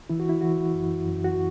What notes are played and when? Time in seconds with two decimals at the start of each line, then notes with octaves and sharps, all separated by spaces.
0.10 E3 E4
0.20 F#4
0.29 E4
0.41 E3 F#4
0.74 F#2
1.05 F#2
1.24 F#4